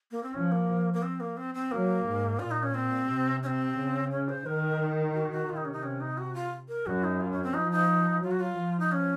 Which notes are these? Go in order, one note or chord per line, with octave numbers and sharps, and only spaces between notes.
A#3
C4
F3 C#4
A#3
A#3
C4
A#3
C4
C4
F#3 A#3
G#2
A#2 F4
D#4
C#4
C4
C3
C#4
C4
C#3
C#4
C5
D#3 A#4
F#4
F#4
C3 F4
D#4
C#4
D#4
C#4
D#4
F#4
F4
A#4
F#2 F#4
D#4
F4
C#4
C4
F3 D#4
D#4
F#3 F4
F#4
F4
F3
D#4
C#4